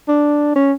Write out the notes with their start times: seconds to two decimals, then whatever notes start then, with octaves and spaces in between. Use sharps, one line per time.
0.08 D4
0.56 C#4